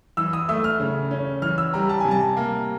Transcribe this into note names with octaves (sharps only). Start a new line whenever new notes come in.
E3 E6
D#6
A3 E6
F6
C#3
C#4
E3 F6
E6
G3 A#5
A5
C3 G#5
A5
A#3